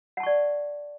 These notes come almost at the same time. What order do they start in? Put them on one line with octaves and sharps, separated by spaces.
F#5 A5 C#6 D5